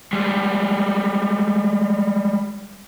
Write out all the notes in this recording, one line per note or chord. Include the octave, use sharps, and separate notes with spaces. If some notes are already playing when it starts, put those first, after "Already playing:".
G3 G#3